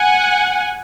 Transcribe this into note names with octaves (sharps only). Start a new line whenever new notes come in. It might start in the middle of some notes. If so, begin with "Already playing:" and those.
Already playing: F#5 G#5